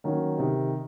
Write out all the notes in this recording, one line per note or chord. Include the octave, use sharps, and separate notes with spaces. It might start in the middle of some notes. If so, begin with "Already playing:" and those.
D#3 F#3 A#3 C#4
C3 D#3